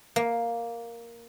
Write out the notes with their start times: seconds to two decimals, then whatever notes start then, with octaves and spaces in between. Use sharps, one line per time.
0.16 A#3